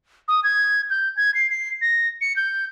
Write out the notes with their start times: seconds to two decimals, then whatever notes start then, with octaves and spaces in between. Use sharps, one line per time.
0.28 D#6
0.44 G#6
0.90 G6
1.17 G#6
1.34 C7
1.50 C7
1.81 A#6
2.21 C#7
2.36 G6